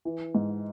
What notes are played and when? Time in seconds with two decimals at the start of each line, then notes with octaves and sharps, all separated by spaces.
0.05 E3
0.35 G#2